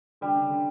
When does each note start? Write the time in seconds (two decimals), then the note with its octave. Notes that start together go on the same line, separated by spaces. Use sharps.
0.21 D3 G3
0.35 C#3
0.50 D3